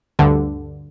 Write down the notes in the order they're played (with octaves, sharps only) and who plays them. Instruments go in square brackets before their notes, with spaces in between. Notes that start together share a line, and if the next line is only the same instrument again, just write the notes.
[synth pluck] D2 G2 D3